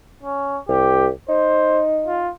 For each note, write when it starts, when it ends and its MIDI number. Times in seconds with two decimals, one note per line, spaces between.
0.23 0.59 61
0.69 1.10 36
0.69 1.06 67
1.29 2.27 63
1.29 1.82 72
2.07 2.30 65